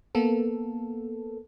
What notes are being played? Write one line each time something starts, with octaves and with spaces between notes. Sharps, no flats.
A#3 B3 A4